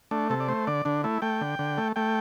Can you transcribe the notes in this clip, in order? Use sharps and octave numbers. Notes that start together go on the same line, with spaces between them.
A3 D4
C3 A4
D5
A3 C5
D3 D5
D3 D4
A3 E4
A3 G5
D3
D3
A3
A3 G5